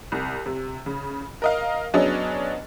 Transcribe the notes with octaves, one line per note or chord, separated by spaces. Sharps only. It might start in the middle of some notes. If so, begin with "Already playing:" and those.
C2
C3
C#3
A#4 D#5 F5
F#3 B3 C#4 D4 G#4 D#5